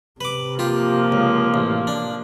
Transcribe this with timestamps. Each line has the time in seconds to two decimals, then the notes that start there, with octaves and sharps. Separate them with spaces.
0.21 C3 B4 D6
0.59 F3 A#3 F4 G4
1.12 C#2
1.54 A1
1.87 D4